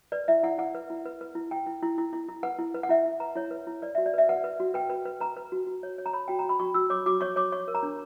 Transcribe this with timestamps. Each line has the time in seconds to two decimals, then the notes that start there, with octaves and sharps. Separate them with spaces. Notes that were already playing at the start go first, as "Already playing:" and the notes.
0.12 B4 D5
0.28 E4 E5
0.43 E4 F#5
0.58 E4 F#5
0.75 B4
0.90 E4
1.06 B4
1.21 B4
1.35 E4
1.51 E4 G5
1.67 E4
1.83 E4
1.98 E4
2.13 E4
2.29 E4
2.43 B4 F#5
2.58 E4
2.74 B4
2.83 F#5
2.89 E4 E5
3.06 E4
3.20 B4 A#5
3.35 E4 C#5
3.51 B4
3.67 E4
3.82 B4 D5
3.95 F#4 E5
4.06 D5
4.14 B4 E5
4.29 B4 F#5
4.44 B4
4.60 F#4
4.74 B4 G5
4.90 B4
5.05 B4
5.20 B4 A#5
5.37 B4
5.52 F#4
5.67 F#4
5.83 C#5
5.98 C#5
6.06 A#5
6.13 C#5 B5
6.28 F#4 G5
6.39 A#5
6.45 F#4 B5
6.60 F#4 C#6
6.74 F#4 E6
6.90 C#5 D6
7.06 F#4 D6
7.21 C#5 C#6
7.36 C#5 D6
7.52 C#5 C#6
7.68 A#4
7.75 A#5
7.83 D4